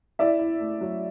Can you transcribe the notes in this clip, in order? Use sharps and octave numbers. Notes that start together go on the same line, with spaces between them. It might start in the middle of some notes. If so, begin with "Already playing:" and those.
E4 D5 E5
E4
A3
F#3